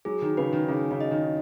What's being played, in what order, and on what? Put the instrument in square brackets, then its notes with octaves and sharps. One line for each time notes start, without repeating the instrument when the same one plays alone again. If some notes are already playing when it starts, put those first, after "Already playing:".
[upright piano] F#3 [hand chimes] G#4
[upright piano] D#3
[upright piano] C#3 [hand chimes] B4
[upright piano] D#3
[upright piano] C#3 [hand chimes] G#4
[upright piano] C#3
[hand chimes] D#5
[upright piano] D#3